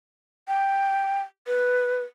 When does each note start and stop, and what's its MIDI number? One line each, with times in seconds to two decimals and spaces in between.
0.48 1.21 79
1.47 2.02 71